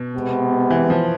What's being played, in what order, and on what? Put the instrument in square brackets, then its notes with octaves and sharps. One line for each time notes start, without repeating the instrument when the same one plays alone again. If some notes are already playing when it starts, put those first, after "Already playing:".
Already playing: [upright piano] B2
[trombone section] C3 G#3 B3
[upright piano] E3
F3